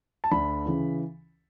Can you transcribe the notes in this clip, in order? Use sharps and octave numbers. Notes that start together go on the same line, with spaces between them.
A5
D2 D3 B5
C#3 E3